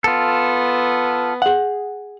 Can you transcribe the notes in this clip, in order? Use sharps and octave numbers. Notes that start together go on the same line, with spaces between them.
B3 F4 A4
G#4 F#5